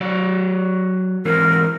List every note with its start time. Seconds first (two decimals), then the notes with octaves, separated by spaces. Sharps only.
0.01 F#3 F#4 D5
1.25 G#2 E3 C4 A#4